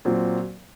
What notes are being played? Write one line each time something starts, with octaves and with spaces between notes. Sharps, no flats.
A#2 F#3 C4